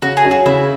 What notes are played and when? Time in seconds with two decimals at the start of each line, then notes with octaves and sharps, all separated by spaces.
0.02 C#3 F#4
0.17 G#4
0.24 F#3 C#4
0.31 F#4
0.46 C#3 E4